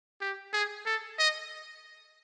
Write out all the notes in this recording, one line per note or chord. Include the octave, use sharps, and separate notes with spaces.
G4
G#4
A4
D#5